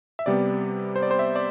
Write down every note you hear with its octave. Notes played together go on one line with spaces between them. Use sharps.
E5
C3 G3 B3 D5
C5
D5
C5
E5
D5